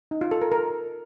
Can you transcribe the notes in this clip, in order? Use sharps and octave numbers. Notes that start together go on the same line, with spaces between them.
D#4
F4
A4
A#4
A#4